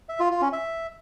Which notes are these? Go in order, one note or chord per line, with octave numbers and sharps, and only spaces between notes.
E5
F4
F4
C#4
E5